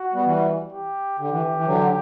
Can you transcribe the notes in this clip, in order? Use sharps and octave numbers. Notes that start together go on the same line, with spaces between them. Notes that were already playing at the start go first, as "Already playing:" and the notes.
Already playing: F#4
G3 B3
E3 G3
G4
D3 G4
E3
E3
D3 F#3